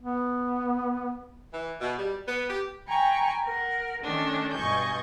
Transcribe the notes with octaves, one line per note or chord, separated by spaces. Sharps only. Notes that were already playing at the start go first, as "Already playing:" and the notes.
B3
E3
B2
G3
B3
G4
G5 G#5 A#5 B5 C#6
A#4 F#5
D#3 A3 C#4 D4 A4
G2 B2 D#5 G#5 C#6 G6